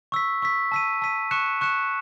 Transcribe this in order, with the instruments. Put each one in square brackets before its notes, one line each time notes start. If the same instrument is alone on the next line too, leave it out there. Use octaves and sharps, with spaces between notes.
[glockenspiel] C#6 E6 B6
C#6 E6 B6
A5 E6 B6 D#7
A5 E6 B6 D#7
C#6 F#6 C#7 E7
C#6 F#6 C#7 E7